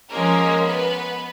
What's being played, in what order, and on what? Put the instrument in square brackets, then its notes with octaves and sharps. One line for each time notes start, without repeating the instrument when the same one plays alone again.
[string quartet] F3 G#3 C#4 [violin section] A#3 A#4
[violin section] B3 B4